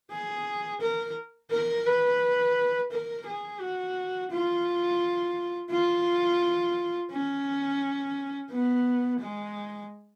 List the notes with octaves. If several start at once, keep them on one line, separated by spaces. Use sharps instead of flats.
G#4
A#4
A#4
B4
A#4
G#4
F#4
F4
F4
C#4
B3
G#3